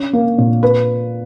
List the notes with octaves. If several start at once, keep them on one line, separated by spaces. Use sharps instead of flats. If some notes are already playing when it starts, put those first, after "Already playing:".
Already playing: C#4
A#3
A#2
B4